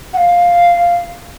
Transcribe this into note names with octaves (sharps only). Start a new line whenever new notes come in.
F#5
F5